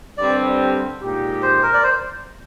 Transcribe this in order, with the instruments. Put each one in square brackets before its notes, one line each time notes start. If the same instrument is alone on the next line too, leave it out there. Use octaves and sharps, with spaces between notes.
[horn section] G2 D3 G3 C4 [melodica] D5
[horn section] A#2 G#3 D#4 G4
[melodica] C5
A#4
D5
C5